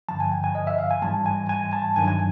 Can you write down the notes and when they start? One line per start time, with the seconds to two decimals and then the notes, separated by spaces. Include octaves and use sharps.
0.09 G2 D3 F3 A5
0.20 G#5
0.32 G5
0.44 G#5
0.55 D#5
0.67 E5
0.78 F5
0.91 G#5
1.02 G#2 E3 G3 A5
1.26 G#5
1.49 G#5
1.73 A5
1.96 G2 D#3 F#3 G#5
2.08 G#5